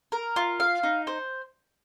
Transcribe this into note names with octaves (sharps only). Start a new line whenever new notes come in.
A#4
F4
F5
D#4
C5